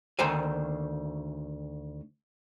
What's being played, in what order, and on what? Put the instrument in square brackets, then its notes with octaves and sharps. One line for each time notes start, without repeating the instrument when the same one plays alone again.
[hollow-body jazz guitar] D2 D#3 C5 G#5